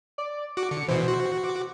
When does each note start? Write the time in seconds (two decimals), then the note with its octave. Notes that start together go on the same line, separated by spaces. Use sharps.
0.18 D5
0.57 F#4 D6
0.71 D3 C#7
0.88 B2 E3 C5
1.08 F#4
1.44 D6